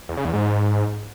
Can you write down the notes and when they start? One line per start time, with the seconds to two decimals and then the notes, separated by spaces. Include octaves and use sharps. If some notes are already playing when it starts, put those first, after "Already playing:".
0.09 E2
0.17 C#3
0.25 E2
0.33 G#2